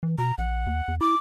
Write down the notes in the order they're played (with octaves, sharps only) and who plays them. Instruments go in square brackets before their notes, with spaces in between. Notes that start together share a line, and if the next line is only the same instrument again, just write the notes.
[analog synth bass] E3
[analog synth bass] B2 [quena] A#5
[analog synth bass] A#1 [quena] F#5
[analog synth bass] D#2
E2
[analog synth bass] E4 [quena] D6